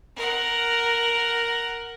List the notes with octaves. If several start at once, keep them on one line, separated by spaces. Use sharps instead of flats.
A#4 F#5